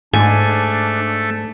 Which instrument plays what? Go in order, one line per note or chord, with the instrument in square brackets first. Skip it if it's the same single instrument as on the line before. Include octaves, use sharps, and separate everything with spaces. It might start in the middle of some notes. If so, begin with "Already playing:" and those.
[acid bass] G#2 [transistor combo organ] A3 [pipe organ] D4 [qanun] G#5